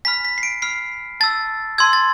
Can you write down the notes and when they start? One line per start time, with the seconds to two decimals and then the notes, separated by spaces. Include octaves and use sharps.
0.05 G#5 B5 F6 B6
0.25 B6
0.38 C7
0.43 D7
0.62 B5 F6 C7
1.20 A5 E6 A6
1.78 A5 C6 E6 G#6
1.93 A6